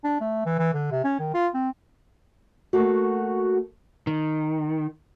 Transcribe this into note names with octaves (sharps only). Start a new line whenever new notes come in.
D4
A3
E3
E3
D3
C3
C#4
D#3
F4
C4
A3 A#3 F#4
D#3